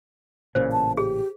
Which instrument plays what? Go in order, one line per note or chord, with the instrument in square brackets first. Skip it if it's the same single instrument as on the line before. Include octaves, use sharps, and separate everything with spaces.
[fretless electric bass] A1 A#2 C#3 [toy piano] C5
[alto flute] A5
[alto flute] G4 [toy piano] G#4